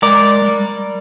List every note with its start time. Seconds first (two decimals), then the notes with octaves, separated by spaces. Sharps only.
0.03 G#3 A#4 D5
0.42 G#3
0.48 G3